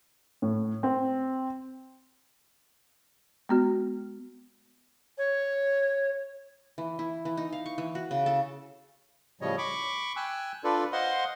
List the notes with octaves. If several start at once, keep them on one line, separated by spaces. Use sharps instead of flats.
A2
C4
G#3 B3 F#4
C#5
E3
E4
E3
D#4
F5
C#6
E3
F#4
C#3
A4
A2 C#3 F3 G3 C#5 D#5
B5 C#6 D6
G5 G#5 E6 F#6
D4 F4 A4 B4 D5
C5 D#5 F5 F#5 C6